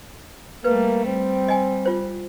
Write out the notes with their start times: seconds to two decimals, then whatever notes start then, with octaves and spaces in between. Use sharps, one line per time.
0.64 G3 A3 A#3 B4
1.06 G3 C4
1.48 D#5 G#5
1.86 F4 C5